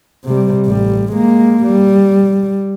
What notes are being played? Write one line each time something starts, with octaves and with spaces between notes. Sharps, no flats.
C3 G3
A1 G3
G#3 A#3
G3